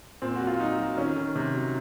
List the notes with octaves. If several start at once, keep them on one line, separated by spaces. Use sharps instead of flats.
A#2 C4
F#3 F#4
F4
F#3 D#4
F#3
D#3 C#4
D#3
C3
F#3